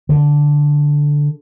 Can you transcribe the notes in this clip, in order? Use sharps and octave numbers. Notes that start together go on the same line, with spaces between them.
D3